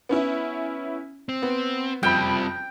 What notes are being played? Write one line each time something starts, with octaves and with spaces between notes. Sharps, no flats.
B3 C#4 E4
C4
B3
F#1 F2 G3 C4 G5 B5